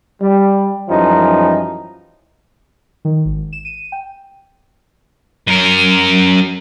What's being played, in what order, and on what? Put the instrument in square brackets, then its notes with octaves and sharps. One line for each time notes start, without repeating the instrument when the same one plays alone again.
[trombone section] G3
F#2 E3 F3 G3 D#4
[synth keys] D#3
G#1
E7
D#7
G5
[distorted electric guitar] F#2 A#4